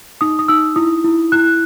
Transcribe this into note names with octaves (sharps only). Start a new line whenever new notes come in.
D#4 D#6
D#6
D#4 E6
E4 D#6
E4
E4 F#6